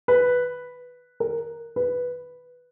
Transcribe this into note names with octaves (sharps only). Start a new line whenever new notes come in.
B4
A#4
B4